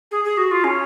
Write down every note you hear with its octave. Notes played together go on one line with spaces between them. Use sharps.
G#4
G#4
F#4
F4
C#4